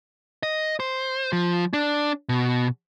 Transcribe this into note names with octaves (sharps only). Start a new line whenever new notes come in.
D#5
C5
F3
D4
B2